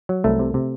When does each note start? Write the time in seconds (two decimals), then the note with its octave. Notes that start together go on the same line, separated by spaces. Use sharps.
0.09 F#3
0.24 C2 A3
0.39 C3
0.54 C3